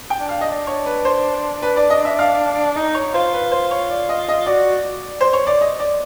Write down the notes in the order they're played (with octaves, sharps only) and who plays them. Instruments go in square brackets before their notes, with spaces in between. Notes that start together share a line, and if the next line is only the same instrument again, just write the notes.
[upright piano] G5
[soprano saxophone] D4
[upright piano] F5
D#5
[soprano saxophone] D4 [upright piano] D5
[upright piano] C#5
B4
C5
B4
D5
D#5
E5
F5
[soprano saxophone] D#4 [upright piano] D#5
[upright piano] C#5
[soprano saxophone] F4 [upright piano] C5
[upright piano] B4
C5
C#5
D5
D#5
D#5
[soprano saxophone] F#4 [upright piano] D5
[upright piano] C5
C#5
D5
D#5
D5